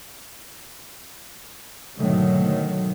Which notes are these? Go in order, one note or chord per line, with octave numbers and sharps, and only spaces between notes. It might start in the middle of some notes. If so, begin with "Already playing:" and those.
G#2 B2 D3 D#3 F#3 A3